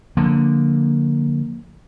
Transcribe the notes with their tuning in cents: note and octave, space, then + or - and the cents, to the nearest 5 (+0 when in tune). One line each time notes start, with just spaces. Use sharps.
D3 +0 F3 +35 A#3 +0